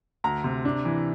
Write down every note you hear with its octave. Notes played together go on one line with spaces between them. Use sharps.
D2 A#5
C3
D4
E3